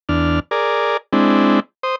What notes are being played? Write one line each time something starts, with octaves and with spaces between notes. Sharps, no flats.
E2 D4 F6
G#4 A#4 D5
G#3 C4 D4 E4
C5 D#6